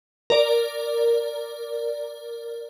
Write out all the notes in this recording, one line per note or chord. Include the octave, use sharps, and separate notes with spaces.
A#4 D5